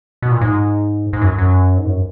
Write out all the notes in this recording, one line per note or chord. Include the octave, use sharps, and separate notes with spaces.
B2
A#2
G#2
G#2
F#2
F#2
G#2
F#2